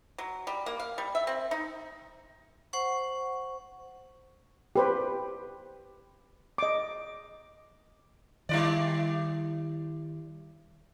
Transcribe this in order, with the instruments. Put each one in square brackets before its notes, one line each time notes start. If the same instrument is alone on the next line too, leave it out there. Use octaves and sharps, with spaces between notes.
[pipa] F#3
G3
A#3
F5
G3
E5
C4
D#4
[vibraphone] C5 F#5 C#6
[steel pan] G4 B4 C5
D#5 D6
[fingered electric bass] D#3 [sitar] G3 E4 D5